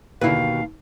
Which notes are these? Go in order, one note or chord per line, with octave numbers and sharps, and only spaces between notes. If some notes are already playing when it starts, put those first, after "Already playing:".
D#2 B2 D3 E4 B4 F5